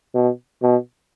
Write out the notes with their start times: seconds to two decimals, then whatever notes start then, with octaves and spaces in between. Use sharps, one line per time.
0.14 B2
0.62 B2